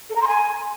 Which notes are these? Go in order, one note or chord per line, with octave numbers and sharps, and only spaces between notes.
A4
A#5
C6
G#5